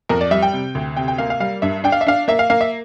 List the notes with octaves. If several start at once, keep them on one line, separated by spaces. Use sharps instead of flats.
F2 A#4
D5
G3 E5
G5
C3
D2
C3 G5
G5
A#3 F5
F5
G3 F5
G2 E5
D4 G5
F5
E5
D4 F5
A#3 E5
F5
A#3 F5
E5